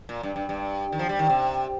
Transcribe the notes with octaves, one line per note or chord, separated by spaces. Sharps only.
A#2
G2
G2
G2
D#3
F3
G3
D#3
C3